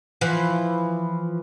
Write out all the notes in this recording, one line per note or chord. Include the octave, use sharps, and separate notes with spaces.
E3 F3